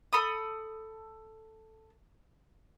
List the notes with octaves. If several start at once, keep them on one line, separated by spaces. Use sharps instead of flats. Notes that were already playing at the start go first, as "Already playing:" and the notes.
A4 B5 D#6